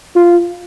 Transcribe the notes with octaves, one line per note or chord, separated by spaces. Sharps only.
F4